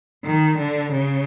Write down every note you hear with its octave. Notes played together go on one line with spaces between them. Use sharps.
D#3
D3
C#3